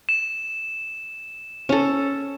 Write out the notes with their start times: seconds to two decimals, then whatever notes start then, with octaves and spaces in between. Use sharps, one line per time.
0.09 E7
1.69 C#4 A4